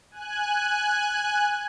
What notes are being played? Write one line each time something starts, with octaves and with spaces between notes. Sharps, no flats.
G#5 F#6